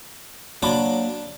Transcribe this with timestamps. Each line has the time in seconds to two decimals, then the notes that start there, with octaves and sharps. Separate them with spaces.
0.63 F#3 A#3 D4 B5 D6